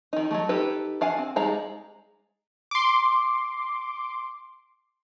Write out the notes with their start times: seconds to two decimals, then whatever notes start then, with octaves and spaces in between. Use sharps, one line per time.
0.13 D#3 D#4
0.31 F#3 G#3 A3
0.49 D#4 G4 A4 B4
1.01 D4 F5 F#5 G#5
1.18 C4
1.36 G3 G#3 D#4 F5 A#5
2.71 C6 D6